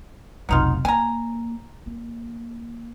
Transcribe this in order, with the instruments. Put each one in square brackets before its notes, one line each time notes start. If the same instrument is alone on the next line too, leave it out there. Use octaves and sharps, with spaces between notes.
[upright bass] F1 B1 [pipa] F#3 D#4 F4
[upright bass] A#3 [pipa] G#5 A#5
[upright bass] A#3